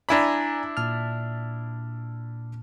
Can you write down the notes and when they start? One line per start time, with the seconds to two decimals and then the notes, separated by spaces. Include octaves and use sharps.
0.09 D4 E4 D5 G#5 A#5 B5
0.77 A#2 A5 F6